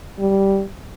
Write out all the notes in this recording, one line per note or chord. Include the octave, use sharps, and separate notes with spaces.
G3